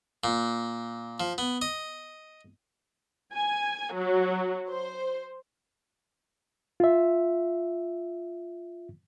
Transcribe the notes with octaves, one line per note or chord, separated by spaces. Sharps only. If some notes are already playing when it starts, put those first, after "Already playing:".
A#2
F3
B3
D#5
G#5
F#3
C5
F4 E5